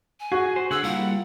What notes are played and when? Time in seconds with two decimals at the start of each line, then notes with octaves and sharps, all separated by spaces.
0.20 G#5
0.32 F#4 G#4
0.56 C5
0.71 D3 G#4 F#5 E6
0.83 G3 A#3 E4 F4 F#5